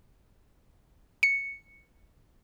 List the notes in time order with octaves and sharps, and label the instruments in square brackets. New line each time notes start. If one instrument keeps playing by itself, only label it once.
[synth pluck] C#7